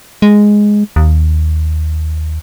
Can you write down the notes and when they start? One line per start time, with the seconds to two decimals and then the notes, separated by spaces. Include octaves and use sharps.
0.22 G#3
0.96 D#2